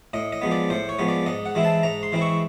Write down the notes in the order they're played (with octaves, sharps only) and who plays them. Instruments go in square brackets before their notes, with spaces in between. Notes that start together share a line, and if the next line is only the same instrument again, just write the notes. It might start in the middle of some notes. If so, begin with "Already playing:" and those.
[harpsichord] A2 D#5
D#5
F3 G#3 B3
D5
A2 C5
C#5
F3 G#3 B3
D5
G#2 D#5
F#5
E3 G#3 C4 E4
A5
G#2 A#5
C6
E3 G#3 C4 E4
C#6